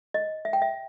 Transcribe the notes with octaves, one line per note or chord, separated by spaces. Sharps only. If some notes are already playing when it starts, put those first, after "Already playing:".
D#5
E5
G5
E5